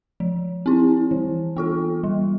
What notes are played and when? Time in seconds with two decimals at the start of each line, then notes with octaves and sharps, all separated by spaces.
0.20 F3
0.66 C4 E4
1.11 E3
1.56 B3 F4 A4
2.03 G3